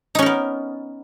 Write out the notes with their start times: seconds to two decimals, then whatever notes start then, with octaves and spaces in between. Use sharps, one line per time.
0.15 D#4
0.19 C#4
0.22 A#4
0.26 B3